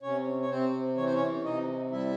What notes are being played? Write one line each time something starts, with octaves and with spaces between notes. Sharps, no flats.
C3 C#4 C#5
C#5
C3 C4 C5
E3 C#5
C5
C#4 C#5
C3 D#4 D#5
G3 E4 E5